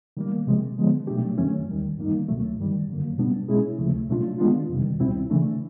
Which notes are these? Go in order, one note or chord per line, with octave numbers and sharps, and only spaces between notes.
D#3 G3 A#3
C3 F3 G#3
D3 F3 G#3 B3
B2 F#3 A3 D4 G4
F#2 D#3 F#3 A3 C#4
D#2 D#3 G3
G2 D#3 G3 A#3 D#4
C#2 B2 F#3 A3
G2 D#3 G3
F#2 D3 F#3 A#3
B2 G3 B3 D4
B2 G#3 C#4 E4 G#4
D2 C#3 F3 A3
B2 F#3 A3 D4 F4
D#3 G#3 B3 D4 F4
F2 C3 D#3 G3
C#2 B2 G3 C4 E4
C#3 E3 A3 D4